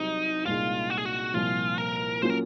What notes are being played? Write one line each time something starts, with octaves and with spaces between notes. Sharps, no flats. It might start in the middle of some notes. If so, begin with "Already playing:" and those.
Already playing: C2 C3 F#3 C4 D#4
C2 A#2 G#3 D#4 F4
F#4
G#4
F#4
C2 A#2 F3 F4
A#4
F#3 A#3 C#4 F4 C5
A#4